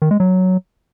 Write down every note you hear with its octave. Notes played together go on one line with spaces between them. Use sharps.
D#3
G#3
F#3